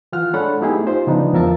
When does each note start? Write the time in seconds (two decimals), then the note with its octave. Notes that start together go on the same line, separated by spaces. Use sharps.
0.12 E3 F4 F#5 F6
0.33 G#3 D4 A4 C#5 F#5 B5
0.61 A3 B3 D#4 E4 G4 G#4
0.86 D#4 F4 G4 C5
1.06 C#3 F3 G#3 B3 D4 D#4
1.33 E2 F3 A#4 E5 A5